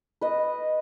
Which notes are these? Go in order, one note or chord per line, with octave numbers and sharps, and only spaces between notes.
B4 D#5